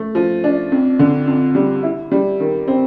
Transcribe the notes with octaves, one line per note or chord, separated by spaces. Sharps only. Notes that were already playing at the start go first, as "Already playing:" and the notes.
Already playing: A3
F3
D4
F2
D3
F2
G3
E4
G3
D#3
C4